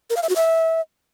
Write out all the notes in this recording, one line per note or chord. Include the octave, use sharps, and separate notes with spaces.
A#4
F5
E5
F#4
E5